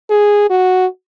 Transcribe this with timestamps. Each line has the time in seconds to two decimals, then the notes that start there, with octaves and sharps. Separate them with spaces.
0.10 G#4
0.50 F#4